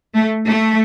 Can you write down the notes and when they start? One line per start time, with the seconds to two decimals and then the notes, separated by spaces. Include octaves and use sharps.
0.15 A3
0.48 A3